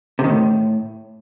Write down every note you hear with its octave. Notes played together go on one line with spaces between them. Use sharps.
C3
D#3
A2